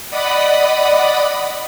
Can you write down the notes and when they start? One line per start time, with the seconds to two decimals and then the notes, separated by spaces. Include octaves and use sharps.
0.10 D5 D#5 F#5 B5 D#6